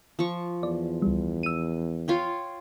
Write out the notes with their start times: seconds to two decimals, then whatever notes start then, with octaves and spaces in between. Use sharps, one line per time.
0.19 F3 C#6
0.63 E2 D5
1.02 C#2 G3
1.43 E6 D#7
2.08 F4 C#5 G5